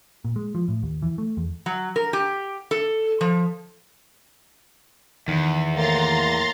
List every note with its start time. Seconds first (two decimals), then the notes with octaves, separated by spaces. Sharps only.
0.25 A#2
0.36 G#3
0.55 F3
0.68 A2
0.83 D#2
1.02 E3
1.18 A3
1.37 E2
1.66 F#3
1.96 A#4
2.13 G4
2.71 A4
3.21 F3
5.28 E2 D#3
5.75 A2 A#3 A#5 C6 A6